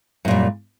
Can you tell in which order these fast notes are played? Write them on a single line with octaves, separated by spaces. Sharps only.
F#2 A#2 G3